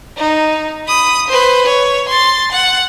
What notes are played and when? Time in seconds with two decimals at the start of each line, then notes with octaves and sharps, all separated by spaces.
0.17 D#4
0.88 B5 D#6
1.28 B4 C5
1.66 C#5
2.09 C6 A6
2.52 F#5